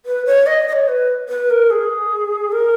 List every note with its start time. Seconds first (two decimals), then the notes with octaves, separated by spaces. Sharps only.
0.06 B4
0.26 C#5
0.46 D#5
0.68 D#5
0.73 C#5
0.88 B4
1.29 B4
1.50 A#4
1.70 G#4
2.52 A#4